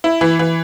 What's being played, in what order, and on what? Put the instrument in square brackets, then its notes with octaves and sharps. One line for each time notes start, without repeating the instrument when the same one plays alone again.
[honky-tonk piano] E4
E3
E3